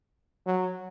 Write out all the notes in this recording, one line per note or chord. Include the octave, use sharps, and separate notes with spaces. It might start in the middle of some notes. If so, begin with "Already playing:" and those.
F#3